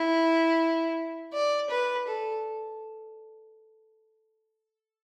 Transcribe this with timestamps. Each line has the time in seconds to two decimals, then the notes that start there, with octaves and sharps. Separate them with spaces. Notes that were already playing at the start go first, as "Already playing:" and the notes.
Already playing: E4
1.33 D5
1.70 B4
2.07 A4